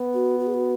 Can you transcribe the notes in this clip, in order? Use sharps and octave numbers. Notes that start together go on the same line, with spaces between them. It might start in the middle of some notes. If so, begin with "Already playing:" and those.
Already playing: B3
F#4
F#4
G#4
F#4